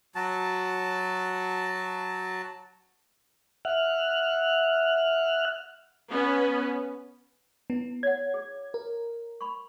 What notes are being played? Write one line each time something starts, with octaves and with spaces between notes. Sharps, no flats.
F#3 F#4 A5
E5 F#5 F6 F#6
B3 C#4
B3 E4
C#5 F#5 G#6
G#4
A#4
B5 C#6